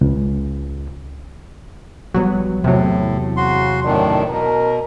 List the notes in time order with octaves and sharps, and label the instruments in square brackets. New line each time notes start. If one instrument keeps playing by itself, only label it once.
[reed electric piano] C#2
[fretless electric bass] A#1 G3 B3 [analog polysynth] F#3
[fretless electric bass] E2 [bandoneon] A2 [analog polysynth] C3 F#3
[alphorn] C#3 [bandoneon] F#4 C6
[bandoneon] F#2 A2 D#3 [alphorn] D4
[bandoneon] B2 [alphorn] A#4